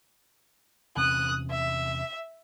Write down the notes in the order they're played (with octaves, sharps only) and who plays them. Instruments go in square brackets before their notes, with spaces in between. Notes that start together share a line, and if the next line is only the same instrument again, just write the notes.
[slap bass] E2 C3 C#4 [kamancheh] D#6 F#6
[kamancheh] E5